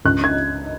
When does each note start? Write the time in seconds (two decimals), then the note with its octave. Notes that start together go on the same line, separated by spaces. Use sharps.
0.05 C#2 F#6
0.24 G#6